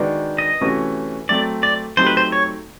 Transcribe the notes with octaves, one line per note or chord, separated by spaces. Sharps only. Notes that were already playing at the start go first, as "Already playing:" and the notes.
Already playing: D#3 G#3 B3 D4 F#4
D#5
C3 E3 A3 C#4 F#4
F#3 A3 C4 D5
D5
F#3 A3 C4 D#4 G4 C5
B4
C5
C#5